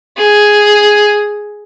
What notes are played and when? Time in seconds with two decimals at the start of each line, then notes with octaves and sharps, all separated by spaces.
0.18 G#4